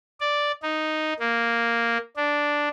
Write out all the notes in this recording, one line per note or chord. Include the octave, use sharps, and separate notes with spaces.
D5
D#4
A#3
D4